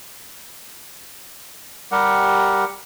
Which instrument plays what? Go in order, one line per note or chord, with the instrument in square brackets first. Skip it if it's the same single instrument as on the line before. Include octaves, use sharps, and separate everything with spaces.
[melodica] G3 G4 A#4 F#5